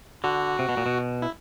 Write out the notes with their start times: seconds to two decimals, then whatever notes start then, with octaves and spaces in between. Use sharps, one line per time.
0.24 D3 F#4
0.59 C3
0.69 B2
0.77 A#2
0.86 B2
1.22 E4